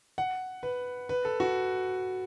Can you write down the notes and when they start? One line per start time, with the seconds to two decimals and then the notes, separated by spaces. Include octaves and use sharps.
0.18 F#5
0.63 B4
1.09 B4
1.25 A4
1.40 F#4